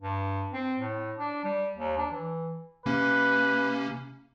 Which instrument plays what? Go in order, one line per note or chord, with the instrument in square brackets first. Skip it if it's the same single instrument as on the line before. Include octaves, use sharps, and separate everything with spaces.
[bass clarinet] G2
C4
A2
D4
G3
D#2
D4
E3
[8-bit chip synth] C3 A#3 C#4 [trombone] B4